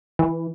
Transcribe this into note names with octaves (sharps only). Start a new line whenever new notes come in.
E3